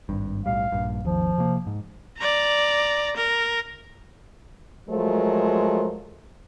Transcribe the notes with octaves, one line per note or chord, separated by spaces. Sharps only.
G#1 G2
B1 A2 G3 F5
A#1 G2
G#1 D#2 F3
C3 A#3
G#2
D5 A#5
A#4
F3 F#3 G#3 A3 A#4 C5